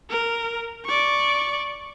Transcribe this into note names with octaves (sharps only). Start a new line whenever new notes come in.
A#4
D5 C#6